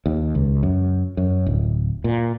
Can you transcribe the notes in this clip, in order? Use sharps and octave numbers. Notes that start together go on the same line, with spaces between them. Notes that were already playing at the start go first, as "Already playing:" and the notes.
D#2
C#2
F#2
F#2
D1
A#2